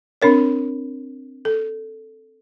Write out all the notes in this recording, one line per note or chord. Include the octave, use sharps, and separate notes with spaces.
C4 D4 A#4 C#5
A4